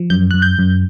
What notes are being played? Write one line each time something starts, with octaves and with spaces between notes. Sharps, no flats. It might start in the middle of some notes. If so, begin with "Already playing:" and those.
Already playing: F3
F#2 G6
F#2 F#6
G6
F#2